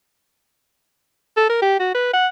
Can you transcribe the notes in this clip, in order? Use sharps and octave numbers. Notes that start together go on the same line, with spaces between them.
A4
A#4
G4
F#4
B4
F#5